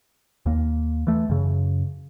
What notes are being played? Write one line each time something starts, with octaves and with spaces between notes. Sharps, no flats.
D#2 A#3
E3 A3
F#2 C#3